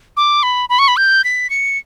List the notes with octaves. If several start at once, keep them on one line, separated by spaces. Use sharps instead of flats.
D6
B5
B5
C#6
B5
G6
B6
C#7